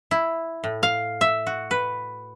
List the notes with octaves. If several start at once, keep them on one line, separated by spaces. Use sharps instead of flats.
E4
A2
F5
E5
F#4
B4